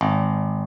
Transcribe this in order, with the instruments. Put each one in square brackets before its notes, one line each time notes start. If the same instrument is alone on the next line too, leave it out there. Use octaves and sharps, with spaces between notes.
[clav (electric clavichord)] G#1